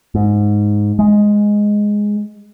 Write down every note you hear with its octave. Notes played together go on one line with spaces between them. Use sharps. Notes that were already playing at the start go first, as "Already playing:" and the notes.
G#2
G#3